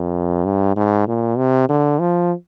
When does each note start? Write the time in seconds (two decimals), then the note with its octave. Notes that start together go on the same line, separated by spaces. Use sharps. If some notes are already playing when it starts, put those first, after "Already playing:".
Already playing: F2
0.45 G2
0.76 G#2
1.08 A#2
1.38 C3
1.69 D3
2.00 F3